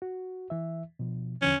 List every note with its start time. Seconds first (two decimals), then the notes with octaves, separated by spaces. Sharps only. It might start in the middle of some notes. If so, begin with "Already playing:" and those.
0.02 F#4
0.50 E3 E5
0.99 B2 F3
1.42 E2 D3 F3 C#4